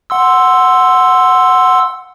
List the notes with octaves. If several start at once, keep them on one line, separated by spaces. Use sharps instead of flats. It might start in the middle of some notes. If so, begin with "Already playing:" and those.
F#5 C6 E6